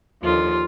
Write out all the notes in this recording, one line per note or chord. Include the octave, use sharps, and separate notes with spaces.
D#2 D3 F3 F4